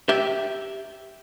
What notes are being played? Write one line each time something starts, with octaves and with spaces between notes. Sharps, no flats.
G4 E5